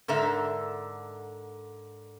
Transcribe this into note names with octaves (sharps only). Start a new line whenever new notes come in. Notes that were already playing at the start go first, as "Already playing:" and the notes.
G#2 D3 A4 A#4 E5